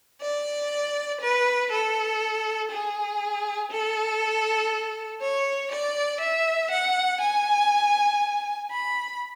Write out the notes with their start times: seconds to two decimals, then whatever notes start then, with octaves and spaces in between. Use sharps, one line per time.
0.22 D5
1.21 B4
1.72 A4
2.71 G#4
3.71 A4
5.21 C#5
5.71 D5
6.21 E5
6.71 F#5
7.21 G#5
8.71 B5